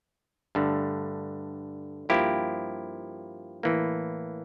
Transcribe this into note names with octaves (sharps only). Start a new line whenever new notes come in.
G2 D3 A3
G2 F3 A#3 E4 G4
A2 E3 A#3